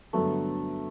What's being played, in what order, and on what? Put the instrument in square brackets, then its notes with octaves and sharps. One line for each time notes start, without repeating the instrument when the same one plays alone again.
[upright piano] G2 D3 F#3 B3 [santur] A3